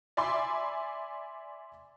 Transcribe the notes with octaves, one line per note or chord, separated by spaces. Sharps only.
D5 E5 G#5 B5 C6 D6